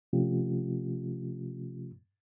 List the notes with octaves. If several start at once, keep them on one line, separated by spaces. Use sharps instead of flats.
C3 F3 A3 C#4 F4 G4